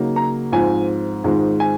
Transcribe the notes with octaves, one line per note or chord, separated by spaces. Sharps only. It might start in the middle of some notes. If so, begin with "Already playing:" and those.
Already playing: C#3 F#3 A#3 D#4
A#5
G#2 F3 C4 F4 G#5
G#2 D#3 G#3 C4 F4
G#5